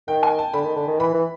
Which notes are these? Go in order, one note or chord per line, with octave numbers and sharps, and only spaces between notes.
D#3 G5
G#5
A5
D3 B5
D#3
D3
D#3
E3 B5
E3